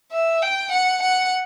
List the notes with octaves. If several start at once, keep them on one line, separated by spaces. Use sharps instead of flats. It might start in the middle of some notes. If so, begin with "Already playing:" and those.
E5
G5
F#5
F#5